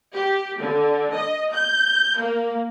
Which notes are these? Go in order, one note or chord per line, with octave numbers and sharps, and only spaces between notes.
G4
D3
D#5
G6
A#3